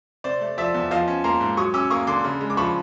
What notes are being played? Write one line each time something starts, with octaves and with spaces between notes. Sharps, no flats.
C3 C5 D5
A3
F3 D5 E5
E2
F3 D#5 F5
C#4
A#3 A#5 C6
G#2
F#3 C#6 D#6
C#4 D6 E6
A#3 C#6 D#6
D3 C6 D6
C#3
G#3
D6
F3 B5 C#6